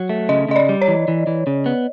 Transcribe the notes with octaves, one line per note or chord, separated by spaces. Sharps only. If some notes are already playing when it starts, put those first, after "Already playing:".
Already playing: F#3
A3
C#3 D#5
C#3 D#5
D5
G3
C#5
E3
E3
E3
C#3
B3